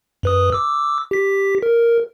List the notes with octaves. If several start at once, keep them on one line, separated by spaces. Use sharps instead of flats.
F#2 B4 D#6
D6 E6
G4 B6
A#4